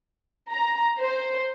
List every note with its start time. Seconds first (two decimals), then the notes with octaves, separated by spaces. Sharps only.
0.49 A#5
0.99 C5